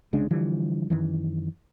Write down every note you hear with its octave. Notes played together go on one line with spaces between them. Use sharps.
C2 C#3 G#3 D4
D3 E3 F3 G3
F#2 C3 D#3 E3